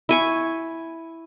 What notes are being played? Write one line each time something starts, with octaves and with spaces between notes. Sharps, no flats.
E4 G#5 C#6